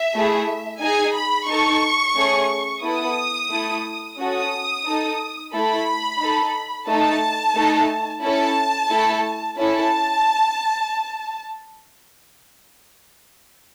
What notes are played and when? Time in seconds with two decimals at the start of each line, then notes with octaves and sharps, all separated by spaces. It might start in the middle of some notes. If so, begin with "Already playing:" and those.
Already playing: E5
0.15 A3 E4 G#4
0.81 D#4 G#4 G#5
1.15 B5
1.48 D#4 A4 C#6
2.16 A3 C#4 G#4
2.83 B3 E4 A4 D#6
3.51 A3 E4 A4
4.18 C#4 F#4 A4 D#6
4.85 D#4 A4
5.53 A3 E4 A4 B5
6.20 D#4 A4
6.88 A3 D#4 A4 A5
7.55 A3 D#4 A4
8.23 C#4 E4 A4 A5
8.90 A3 E4 A4
9.57 C#4 E4 A4 A5